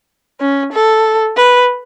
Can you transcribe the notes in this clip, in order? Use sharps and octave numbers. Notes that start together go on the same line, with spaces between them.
C#4
A4
B4